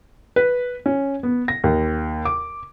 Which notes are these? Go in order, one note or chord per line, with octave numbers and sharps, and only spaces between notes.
B4
C#4
B3
A#6
D#2
D6